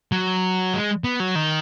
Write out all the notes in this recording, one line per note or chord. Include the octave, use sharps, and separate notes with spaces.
F#3
G#3
B3
F#3
D#3